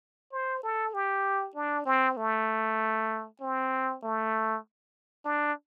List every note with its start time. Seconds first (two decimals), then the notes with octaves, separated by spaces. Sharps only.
0.32 C5
0.63 A4
0.94 G4
1.56 D4
1.86 C4
2.17 A3
3.41 C4
4.03 A3
5.25 D4